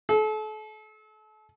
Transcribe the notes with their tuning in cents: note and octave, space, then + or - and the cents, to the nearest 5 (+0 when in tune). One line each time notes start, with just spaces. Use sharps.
A4 -35